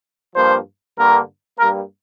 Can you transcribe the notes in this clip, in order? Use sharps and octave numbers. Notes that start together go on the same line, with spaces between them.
G2 F3 A#3 C5
G2 D3 A#3 A#4
G2 G3 A#3 A#4